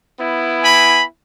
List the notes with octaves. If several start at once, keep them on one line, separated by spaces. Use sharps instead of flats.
B3 E4
G#5 B5